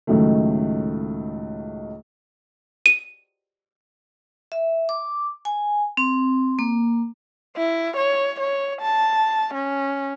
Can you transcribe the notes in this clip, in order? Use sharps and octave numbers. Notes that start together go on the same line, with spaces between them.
C#2 A2 D#3 F#3 A3
D#7
E5
D6
G#5
C4
A#3
E4
C#5
C#5
A5
C#4